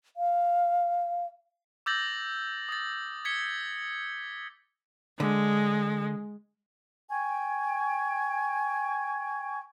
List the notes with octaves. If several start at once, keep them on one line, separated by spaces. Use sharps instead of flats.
F5
D6 E6 G6 A6 A#6 F#7
D#6 A6
G#6 B6 C#7 G7
D3 G#3
G5 G#5 C#6 G#6